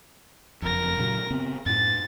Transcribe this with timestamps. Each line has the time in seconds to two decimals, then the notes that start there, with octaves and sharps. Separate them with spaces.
0.62 F#1 F2 A#4 A#6
0.98 A#2 C#3 F#3
1.31 C#3 B3 C4
1.66 F#2 A2 A6